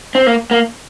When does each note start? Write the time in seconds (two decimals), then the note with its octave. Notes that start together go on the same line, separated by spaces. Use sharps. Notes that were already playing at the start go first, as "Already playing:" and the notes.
0.15 C4
0.27 A#3
0.51 A#3